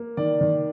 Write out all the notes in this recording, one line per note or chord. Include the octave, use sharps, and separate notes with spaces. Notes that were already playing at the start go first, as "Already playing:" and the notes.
Already playing: A#3
D#3 D5
D#3